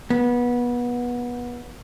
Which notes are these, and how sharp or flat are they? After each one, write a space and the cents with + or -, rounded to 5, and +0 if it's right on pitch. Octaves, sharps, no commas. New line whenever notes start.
B3 -25